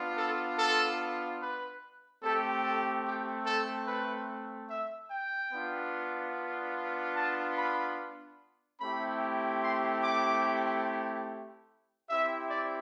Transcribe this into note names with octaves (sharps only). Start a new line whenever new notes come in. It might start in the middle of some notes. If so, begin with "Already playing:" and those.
Already playing: B3 D4 F4
A4
A4
B4
A3 C4 G4 A4
A4
G4
A4
B4
E5
G5
B3 D4 F4
A5
B5
A3 C4 E4 G4 B5
C6
D6
C4 E4 G4 E5
D5